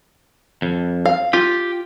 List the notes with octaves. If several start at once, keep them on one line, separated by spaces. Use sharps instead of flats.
F2
F5
F4 G4